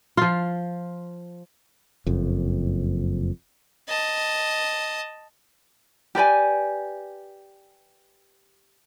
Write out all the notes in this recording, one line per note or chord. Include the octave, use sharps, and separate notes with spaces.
F3 F4
F#1 F2
D#5 A5
G4 B4 D5 G#5